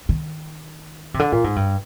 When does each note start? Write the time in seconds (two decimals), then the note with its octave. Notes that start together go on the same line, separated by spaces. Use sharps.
0.09 D#3
1.14 C3
1.19 D3
1.32 A#2
1.44 G#2
1.56 G2